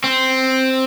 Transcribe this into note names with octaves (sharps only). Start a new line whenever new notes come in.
C4